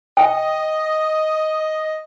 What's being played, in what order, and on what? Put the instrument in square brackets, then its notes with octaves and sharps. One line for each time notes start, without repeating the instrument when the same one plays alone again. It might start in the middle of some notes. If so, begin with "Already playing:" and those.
[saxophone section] D#5 [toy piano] G5